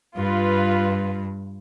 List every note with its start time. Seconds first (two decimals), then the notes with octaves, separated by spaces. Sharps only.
0.16 G2 F4 B4